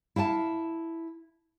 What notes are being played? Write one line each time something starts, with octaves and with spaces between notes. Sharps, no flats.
E4 F5 G5 A5